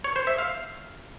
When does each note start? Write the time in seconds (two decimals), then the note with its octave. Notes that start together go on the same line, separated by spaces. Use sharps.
0.04 C#5
0.16 C5
0.27 E5
0.38 F5